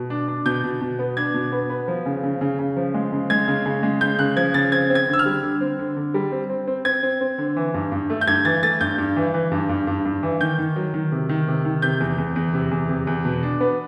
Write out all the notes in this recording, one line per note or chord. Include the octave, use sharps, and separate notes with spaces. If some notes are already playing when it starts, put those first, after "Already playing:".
Already playing: B2
D4
D4
B2 G6
B2
B2
B3
D4 G#6
B2
B3
B3
F3
C#3
C#3
C#3
C#3
F3
G#3
C#3
G#3 G#6
C#3
C#3
G#3
C#3 G6
C#3 F#6
F3 G#6
C#3 A6
C4 G#6
C4
G#6
D3
E6
F6
G3
D3
C4
D3
D3
G3
C4
C4
C4
C4 G#6
C4
C4
D3
E3
G2
G2
A3
G6
G2 G#6
E3 A6
A3 A6
G2 G6
G2
E3
E3
G2
G2
G2
G2
E3
D#3 G6
D#3
F#3
D#3
C3
D#3
C3
D#3
C3 G6
E2
E2
E2
C3
E2
C3
E2
B2
D4
B3